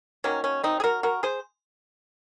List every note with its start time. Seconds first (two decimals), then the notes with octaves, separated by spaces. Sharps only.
0.24 D#3 F#3 A#3 C#4
0.44 C#4
0.64 C4 D#4
0.80 G#4
0.84 F#4 A#4
1.03 F#4 A#4
1.23 G#4 C5